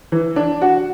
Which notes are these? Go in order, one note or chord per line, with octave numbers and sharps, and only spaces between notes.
E3
D4
F#4